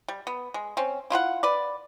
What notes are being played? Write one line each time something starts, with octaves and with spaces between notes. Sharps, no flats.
G3
B3
G#3
C4 C#4
E4 F4 B4 F#5
B4 D5